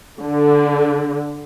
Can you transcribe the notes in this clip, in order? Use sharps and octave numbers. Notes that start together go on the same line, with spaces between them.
D3